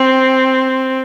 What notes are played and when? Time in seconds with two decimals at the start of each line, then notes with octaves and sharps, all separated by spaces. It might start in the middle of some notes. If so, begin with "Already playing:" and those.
Already playing: C4